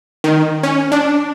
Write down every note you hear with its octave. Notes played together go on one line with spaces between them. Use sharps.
D#3
C#4
D4